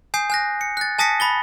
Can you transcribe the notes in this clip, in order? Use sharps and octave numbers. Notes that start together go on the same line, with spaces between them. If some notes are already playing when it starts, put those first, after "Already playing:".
G#5 D#6 G6 C7
G#5 F#6 A#6
C#7
F#6 A6
G#5 A5 D#6 A#6 B6 C#7
B5 A6 G7